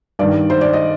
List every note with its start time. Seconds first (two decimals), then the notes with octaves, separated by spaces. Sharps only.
0.19 G2 D#3 D5
0.50 C5
0.61 D5
0.73 D#5